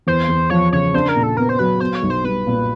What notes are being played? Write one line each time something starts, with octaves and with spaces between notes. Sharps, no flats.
E2 C5
E2
F3 C#5
C#3 C#5
D4 C5
A#4
A#2
A4
B3 A#4
C5
F#3 B4
B3 C5
C#5
B1
C5
G3 B4
A#2